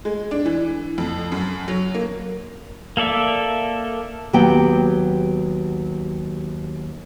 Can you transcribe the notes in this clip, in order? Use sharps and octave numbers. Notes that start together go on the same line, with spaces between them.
G#3
D4
E3
F2
F#2
F#3
A#3
A#3 A4 D5 E5
D#2 F#3 B3 G4 G5